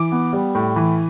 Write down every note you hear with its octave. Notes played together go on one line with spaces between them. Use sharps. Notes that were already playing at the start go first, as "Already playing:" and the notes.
Already playing: E3 D6
B3
G3
A2
E3